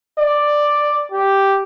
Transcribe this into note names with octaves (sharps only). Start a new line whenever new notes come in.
D5
G4